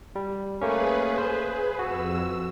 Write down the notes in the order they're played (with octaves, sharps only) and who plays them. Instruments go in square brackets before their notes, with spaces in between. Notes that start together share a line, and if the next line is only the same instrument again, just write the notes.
[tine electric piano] G3
[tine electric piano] A3 A#3 C#4 [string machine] G#4 B4
[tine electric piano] C5
[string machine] F2 E6 [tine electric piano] F#4